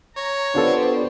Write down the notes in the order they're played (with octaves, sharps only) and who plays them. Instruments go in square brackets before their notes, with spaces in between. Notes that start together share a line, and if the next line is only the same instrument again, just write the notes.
[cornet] C#5 [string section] A#5
[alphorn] B3 [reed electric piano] D4 F4 A4 [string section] G4 C5 D5